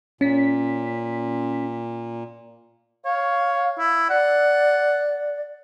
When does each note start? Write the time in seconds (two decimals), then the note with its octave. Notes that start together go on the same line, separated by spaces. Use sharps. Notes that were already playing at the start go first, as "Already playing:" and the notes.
0.21 A#2 C#4 B6
3.05 C#5 F5
3.78 E4
4.10 D5 F#5